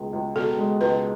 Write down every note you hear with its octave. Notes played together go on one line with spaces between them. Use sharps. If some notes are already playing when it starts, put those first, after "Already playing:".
Already playing: C#2 B2 G#3
C#2
B2 A4
G#3
C#2 B4